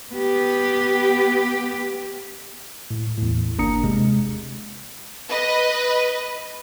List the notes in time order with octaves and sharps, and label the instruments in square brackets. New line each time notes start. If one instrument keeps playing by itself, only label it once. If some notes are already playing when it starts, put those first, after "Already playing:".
[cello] B3 G4
[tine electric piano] A2
E2 A2
G1 A#3 D4 A#5 D#6 C#7
C3 G#3
[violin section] B4 D#5